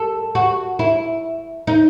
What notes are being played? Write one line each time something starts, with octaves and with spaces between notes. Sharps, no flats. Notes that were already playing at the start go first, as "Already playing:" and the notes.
Already playing: A4
F#4
E4
D#4